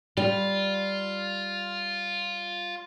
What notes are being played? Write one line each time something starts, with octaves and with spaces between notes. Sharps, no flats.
G3 F4